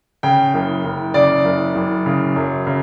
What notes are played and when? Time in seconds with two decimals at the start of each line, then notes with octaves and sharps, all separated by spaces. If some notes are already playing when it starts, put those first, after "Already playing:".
0.23 C#3 G5
0.54 F#1
0.85 F#1
1.14 C#3 D5
1.45 F#1
1.75 F#1
2.06 C#3
2.36 F#2
2.67 C#3